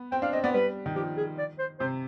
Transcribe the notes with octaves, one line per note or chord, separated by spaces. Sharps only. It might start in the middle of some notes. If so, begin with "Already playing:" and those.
Already playing: B3
C4 G5
D4 F5
C4 D#5
B3 D5
G3 B4
D#3
F3 G4
G#4
D5
C5
C3 C5